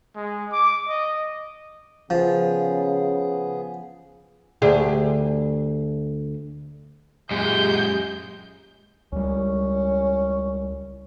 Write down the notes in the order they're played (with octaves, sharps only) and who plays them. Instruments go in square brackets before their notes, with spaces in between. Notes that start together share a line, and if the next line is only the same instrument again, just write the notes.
[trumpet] G#3
D6
D#5
[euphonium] C#3 [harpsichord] F3 [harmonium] B3 G#4
[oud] D2 G4 G#4
[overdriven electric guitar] F#2 A#2 [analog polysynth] G#3 [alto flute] G4 [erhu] G6
[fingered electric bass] C#2 G3 [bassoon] C#4